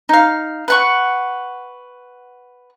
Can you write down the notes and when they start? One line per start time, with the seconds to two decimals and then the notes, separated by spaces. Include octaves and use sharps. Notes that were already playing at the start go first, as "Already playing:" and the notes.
0.09 D#4 F5
0.68 B4 F#5 C#6